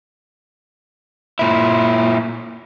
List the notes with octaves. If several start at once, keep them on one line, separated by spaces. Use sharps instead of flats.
A#2 E4